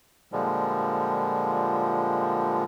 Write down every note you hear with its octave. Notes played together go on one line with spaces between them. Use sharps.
A#2 D3 F3 G3 G#3